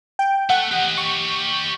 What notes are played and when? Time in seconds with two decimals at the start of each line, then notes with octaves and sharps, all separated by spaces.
0.19 G5
0.50 A3 F#5
0.71 G4 D#5
0.98 C#6